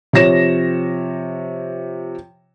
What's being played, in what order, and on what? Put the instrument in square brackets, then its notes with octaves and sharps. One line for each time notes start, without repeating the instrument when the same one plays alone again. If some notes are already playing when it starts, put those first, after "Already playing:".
[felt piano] C3 F3 C#5 A#6 E7